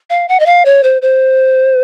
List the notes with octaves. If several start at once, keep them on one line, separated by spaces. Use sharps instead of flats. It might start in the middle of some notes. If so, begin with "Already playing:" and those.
F5
F#5
D#5
F5
C#5
C5
C5